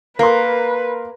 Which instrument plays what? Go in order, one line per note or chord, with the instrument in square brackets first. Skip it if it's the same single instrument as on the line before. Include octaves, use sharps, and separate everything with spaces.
[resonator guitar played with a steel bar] A#3 [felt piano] A#4 C6 [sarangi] B4